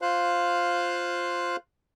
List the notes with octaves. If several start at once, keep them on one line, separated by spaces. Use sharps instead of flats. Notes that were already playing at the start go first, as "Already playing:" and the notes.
F4 C5 F5 F#6